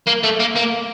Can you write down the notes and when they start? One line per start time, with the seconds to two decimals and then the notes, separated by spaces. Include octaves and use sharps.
0.07 A#3
0.24 A3
0.40 A#3
0.55 A#3